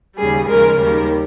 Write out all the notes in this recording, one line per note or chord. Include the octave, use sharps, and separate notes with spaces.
D#2 C#3 G3 G#4
D#2 C#3 F3 G#3 A#4
D#2 D#3 G3 A#4